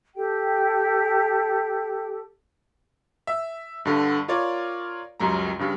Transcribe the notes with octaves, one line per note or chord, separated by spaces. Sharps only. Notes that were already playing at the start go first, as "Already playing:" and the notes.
G4 A4 G5
E5
G2 D3
F4 A#4 C#5 D5
C#2 F#2 G3 A#5
G2 C#3 G3